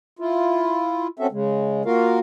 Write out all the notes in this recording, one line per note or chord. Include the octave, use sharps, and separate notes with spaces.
E4 F4
C4 C#4 F#4 A4 E5
C#3 G#3
A#3 F4 F#4 A#4 F5